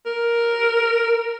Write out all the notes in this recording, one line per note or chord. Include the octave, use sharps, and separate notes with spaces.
A#4